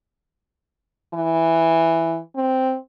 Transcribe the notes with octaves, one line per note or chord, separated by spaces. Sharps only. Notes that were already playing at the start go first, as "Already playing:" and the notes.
E3
C4